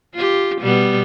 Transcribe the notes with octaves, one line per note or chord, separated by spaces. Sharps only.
F4 G4
B2 G3 B3